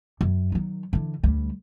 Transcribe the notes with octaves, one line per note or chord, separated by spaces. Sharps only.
F#2
D#3 F#3
D3 E3
D2 G3